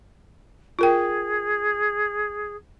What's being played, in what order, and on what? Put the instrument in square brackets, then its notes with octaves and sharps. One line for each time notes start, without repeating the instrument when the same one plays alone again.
[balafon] F4 A#4 G5 [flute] G#4